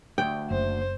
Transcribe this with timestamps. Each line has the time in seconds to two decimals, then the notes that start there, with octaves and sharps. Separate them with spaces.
0.18 D2 G5
0.51 F#1 C5